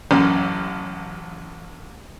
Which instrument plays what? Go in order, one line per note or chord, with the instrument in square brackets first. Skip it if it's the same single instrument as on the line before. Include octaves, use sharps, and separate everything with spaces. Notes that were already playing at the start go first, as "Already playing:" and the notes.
[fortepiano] A1 F#2